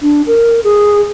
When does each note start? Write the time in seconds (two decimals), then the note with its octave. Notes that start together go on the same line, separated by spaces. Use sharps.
0.02 D4
0.27 A#4
0.64 G#4